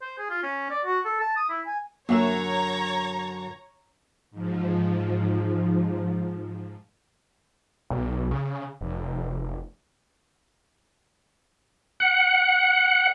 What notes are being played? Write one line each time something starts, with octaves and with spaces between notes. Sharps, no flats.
C5
G#4
F4
C#4
D5
F#4
A4
A5
D#6
E4
G#5
F#2 D3 A#3 C#5 E5 A#5 E7
G#2 F3
B1
C#3
F1
F#5